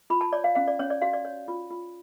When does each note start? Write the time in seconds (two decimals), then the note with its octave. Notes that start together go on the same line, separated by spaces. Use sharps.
0.10 F4 B5
0.21 A5
0.33 C#5 D5
0.44 F5
0.55 C#4 F5
0.68 D5
0.79 C#4 C#5
0.90 D5
1.02 F#4 F5
1.13 D5
1.25 C#5
1.48 F4
1.70 F4